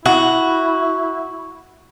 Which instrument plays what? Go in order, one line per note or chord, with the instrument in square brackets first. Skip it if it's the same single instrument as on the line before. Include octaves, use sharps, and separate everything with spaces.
[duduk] E4 [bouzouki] F#4